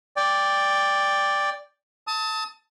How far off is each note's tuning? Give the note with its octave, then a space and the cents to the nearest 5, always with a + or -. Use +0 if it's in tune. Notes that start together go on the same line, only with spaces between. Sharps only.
D5 +0 G5 +15
A5 +15 D#6 +40